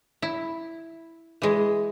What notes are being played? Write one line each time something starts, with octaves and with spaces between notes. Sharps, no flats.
E4
E3 G#3